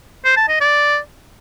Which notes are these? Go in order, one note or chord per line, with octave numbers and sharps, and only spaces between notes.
C5
A5
D#5
D5